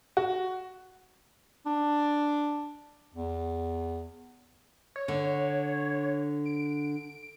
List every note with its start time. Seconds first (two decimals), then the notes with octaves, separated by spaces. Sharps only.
0.17 F#4
1.66 D4
3.14 E2
4.96 C#5
5.08 D3
6.45 D7